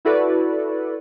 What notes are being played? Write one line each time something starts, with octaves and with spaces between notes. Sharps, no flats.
E4 F#4 A4 B4 D5